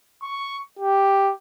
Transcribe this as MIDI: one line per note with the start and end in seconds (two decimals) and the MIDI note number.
0.23 0.58 85
0.79 1.32 67